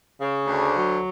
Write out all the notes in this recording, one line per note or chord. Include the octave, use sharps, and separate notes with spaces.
C#3
D2
F#3